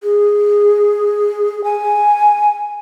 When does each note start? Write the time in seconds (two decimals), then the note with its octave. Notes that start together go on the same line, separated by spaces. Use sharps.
0.03 G#4
1.64 G#5